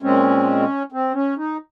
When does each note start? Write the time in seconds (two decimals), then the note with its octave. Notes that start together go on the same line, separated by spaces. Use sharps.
0.02 A#2 G#3 C4 C#4
0.92 C4
1.14 C#4
1.37 D#4